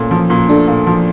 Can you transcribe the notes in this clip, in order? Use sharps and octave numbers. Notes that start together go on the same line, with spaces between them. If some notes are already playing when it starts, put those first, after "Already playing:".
Already playing: A#2 A3 C#4
F3
A#2
A3 D4
A#2
F3